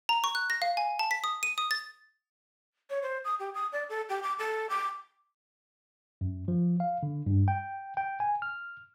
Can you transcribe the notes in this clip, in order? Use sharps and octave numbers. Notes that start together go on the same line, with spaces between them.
A#5
C#6
F#6
A#6
F5
G#5
A5
B6
D#6
D#7
D#6
A6
C#5
C5
D#6
G4
D#6
D5
A4
G4
D6
A4
D6
F#2
F3
F5
D3
G2
G5
G5
G#5
F6